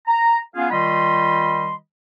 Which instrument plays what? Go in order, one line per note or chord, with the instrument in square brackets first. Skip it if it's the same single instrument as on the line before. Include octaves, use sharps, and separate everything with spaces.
[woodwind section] A#5
B3 C#4 F4 G#4 F5
D#3 G3 F4 D#5 B5 C6